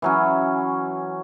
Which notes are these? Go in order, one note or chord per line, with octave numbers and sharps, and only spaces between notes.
E3 F#3 C#4